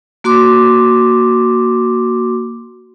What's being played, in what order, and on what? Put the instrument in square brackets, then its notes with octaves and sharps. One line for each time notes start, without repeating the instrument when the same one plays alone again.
[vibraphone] A#3 F#4 C6 D6